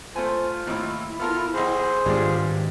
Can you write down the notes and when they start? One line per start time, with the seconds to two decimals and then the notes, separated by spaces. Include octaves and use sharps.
0.16 A3 F4 C5 G#5
0.67 D#2 A2 E4
1.20 B3 F4 A4 A#4 F6
1.54 B1 E3 G#4 C5
2.06 G#1 G2 G3 G#3 D4 F4